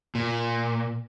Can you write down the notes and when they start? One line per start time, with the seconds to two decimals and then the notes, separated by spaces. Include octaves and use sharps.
0.15 A#2